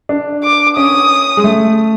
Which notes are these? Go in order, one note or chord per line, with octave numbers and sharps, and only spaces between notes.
D4
D6
C#4 D#6
G#3
A3